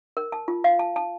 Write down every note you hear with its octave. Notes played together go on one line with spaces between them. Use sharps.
A#4
A5
F4
F5
A5
A5